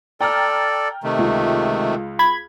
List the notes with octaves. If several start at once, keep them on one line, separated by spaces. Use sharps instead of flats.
A4 D5 G5 A#5 F6
C3 D#3 A3
C#2
B5 G#6